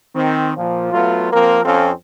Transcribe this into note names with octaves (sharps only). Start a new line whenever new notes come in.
D#3 C4
A#2 F3
F#3 A3 B3 F4
F3 A#3 C4 A#4
F2 C4 C#4 F4 A4